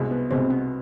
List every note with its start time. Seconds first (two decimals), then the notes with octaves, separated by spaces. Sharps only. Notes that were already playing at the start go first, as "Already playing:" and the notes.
Already playing: C2 B2 G#3
0.11 B3
0.31 C2 B2 G#3 C4
0.50 B3